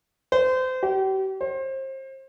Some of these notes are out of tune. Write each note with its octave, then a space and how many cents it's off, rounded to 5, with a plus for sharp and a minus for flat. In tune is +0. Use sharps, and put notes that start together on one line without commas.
C5 -30
G4 -40
C5 +30